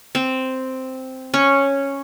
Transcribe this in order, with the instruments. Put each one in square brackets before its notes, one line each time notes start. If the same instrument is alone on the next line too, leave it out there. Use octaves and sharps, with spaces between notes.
[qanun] C4
C#4